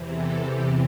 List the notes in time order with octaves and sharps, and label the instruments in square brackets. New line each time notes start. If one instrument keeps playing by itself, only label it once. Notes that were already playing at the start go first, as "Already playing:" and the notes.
Already playing: [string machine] E2 C3 E3
A4
G4